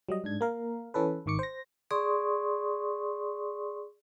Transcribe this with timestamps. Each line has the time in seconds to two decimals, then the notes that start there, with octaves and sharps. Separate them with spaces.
0.09 F#3 G3 D#5
0.24 G#2 D4 G#6
0.41 A#3 A#4 F5
0.94 E3 C#4 A4 B4
1.26 G#1 D#3 C#6 D6 C#7
1.39 C5 A#6
1.91 G#4 D5 C6 C#6 D#6